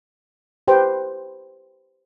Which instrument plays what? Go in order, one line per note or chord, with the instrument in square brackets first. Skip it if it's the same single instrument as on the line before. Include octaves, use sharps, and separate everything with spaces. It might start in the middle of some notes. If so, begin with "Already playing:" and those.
[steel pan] G4 B4 C5 G5